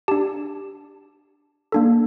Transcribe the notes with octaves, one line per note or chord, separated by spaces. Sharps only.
D4 G4 A5
A#3 D4 A4